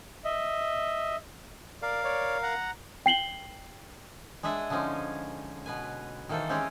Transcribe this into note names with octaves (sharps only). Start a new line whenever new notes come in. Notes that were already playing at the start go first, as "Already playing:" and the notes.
D#5 E5
A#4 D5 F5
C#5 D5
F#5 A#5
G5 C7 F#7 G7
G#3 D4 G#4 E5 F#5
D3 F3 G#3 C#4 D#4
B2 B4 G#5
D#3 E3 A#3 A4 C5
G#3 C4 C#4 G4 G#4